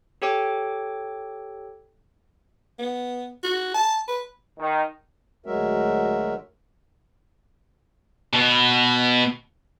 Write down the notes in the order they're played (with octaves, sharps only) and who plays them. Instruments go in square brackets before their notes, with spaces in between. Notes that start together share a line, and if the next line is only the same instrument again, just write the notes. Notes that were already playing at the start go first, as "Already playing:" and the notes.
[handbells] G4 A4 C#5 G5 D6
[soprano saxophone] B3
F#4
A5
B4
[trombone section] D#3
[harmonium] D2 F#3 G#3 F#4 A#4 E5
[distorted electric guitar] B2 B3